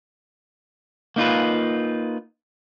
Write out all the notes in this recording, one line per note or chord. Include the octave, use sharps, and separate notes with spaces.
A#3 D#4 F4 B4